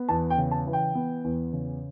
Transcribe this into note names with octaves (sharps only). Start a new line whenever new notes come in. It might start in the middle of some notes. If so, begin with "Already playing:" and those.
Already playing: B3
E2 A5
G5
C#3
A5
E3
G5
B3
E2
C#3